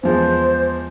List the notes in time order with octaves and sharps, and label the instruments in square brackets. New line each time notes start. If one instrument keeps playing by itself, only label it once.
[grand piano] E2 F3 G#3 [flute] C5